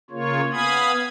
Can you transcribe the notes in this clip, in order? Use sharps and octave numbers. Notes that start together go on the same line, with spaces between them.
C#3 A#3 F4 C#5
B3 F5 G#5 B5 D#6 G#6